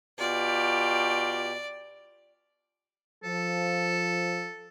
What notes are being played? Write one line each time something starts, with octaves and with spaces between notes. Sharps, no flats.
B2 F4 G4 D5
F3 A4